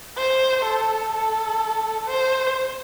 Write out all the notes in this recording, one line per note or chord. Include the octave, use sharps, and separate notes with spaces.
C5
A4
A4
C5